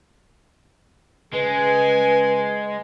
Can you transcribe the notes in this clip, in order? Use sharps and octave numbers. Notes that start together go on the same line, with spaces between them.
C#3 G#3 G#4 B4 G#5